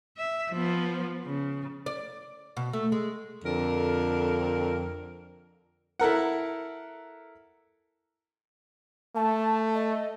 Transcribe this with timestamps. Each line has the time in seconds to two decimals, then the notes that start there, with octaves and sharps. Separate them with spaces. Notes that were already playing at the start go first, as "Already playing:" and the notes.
0.18 E5
0.52 F3 B3
1.26 C#3
1.86 D5
2.57 B2
2.73 A3
2.92 G#3
3.44 F2 D3 A#4
6.00 E4 A4 A#4 F#5
9.16 A3 A5
9.74 D#5